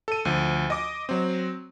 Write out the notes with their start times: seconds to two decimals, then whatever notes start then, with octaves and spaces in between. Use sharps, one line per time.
0.08 A4 D#7
0.25 D2 F3
0.70 D#5 D6
1.09 F#3 C4